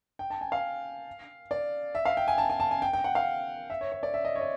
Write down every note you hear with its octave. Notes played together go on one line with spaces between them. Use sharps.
G5
A5
G#5
F5
D5
E5
F5
G5
G#5
A5
G#5
A5
G#5
G5
G5
F#5
F5
E5
C#5
C#5
D5
E5
D#5
C#5
D#5